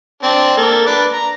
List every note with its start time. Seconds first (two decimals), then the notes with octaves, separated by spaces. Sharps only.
0.23 C4 D4
0.57 A#3 A4
0.86 D4 B4 D6
1.12 A#5